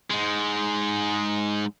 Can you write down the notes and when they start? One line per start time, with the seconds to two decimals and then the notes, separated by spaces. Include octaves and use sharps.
0.10 G#2 G#3